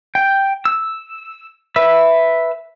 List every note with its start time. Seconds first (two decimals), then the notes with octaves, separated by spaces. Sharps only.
0.15 G5
0.65 E6
1.76 B4 E5 E6